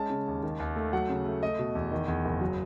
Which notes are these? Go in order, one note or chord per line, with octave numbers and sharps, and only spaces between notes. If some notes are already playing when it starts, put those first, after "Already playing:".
Already playing: G#3 C#4 A5
C#3
D#2
D#3
D#2
A3
F#3 F#5
C#3
A3
A3 D#5
B2
E2
D#3
E2
F#1
F#3